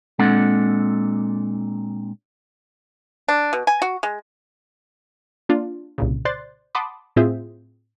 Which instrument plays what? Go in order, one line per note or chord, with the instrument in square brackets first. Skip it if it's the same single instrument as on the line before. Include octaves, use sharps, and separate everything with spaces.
[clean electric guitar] A#2 G#3 C4 D4 A4 F#5
[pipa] D4
B2
G#5
F#4
G#3
[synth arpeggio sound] A#3 D4 F4 D5
C2 A#2 C#3
C5 D5 C6 F#6 A6 C7
F#5 A5 B5 C6 D6 D#6
A2 C4 F4 G#4 C5 E5